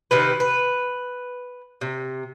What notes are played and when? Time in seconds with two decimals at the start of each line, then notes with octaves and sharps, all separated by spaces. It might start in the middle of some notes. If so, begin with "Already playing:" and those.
0.11 C3 D#3 B4
0.40 B4
1.81 C3